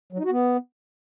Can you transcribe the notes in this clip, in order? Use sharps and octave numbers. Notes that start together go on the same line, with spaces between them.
F#3
D#4
F#4
B3